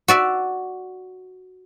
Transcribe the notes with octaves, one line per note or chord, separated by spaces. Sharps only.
F#4 D5 E5